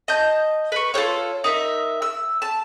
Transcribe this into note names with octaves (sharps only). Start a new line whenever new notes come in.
D#5 A5 G6
B4 C#6
F4 A4 C5 C#5
D#4 A#4 E5
E6
A5